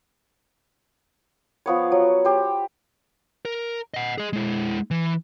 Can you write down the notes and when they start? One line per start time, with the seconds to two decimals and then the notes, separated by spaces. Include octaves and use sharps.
1.66 F3 B3 C#5
1.92 F#3
2.25 G4 C5
3.45 A#4
3.94 D#5 F#5
4.18 G#4 D#5
4.33 G#3 E4
4.91 E3